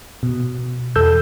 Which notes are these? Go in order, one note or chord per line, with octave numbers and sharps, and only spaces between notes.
B2
E2 A4 E6 G6